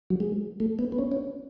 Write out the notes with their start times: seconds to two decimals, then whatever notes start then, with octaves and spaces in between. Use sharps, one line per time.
0.10 F#3
0.20 G#3
0.60 A3
0.79 B3
0.92 B3
0.98 C#4
1.12 C#4